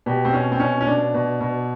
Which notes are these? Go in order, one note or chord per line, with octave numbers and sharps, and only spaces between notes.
B2 G4
C4
B2 C#4
C4
B2 C#4
C#4
B2 D4
B2
B2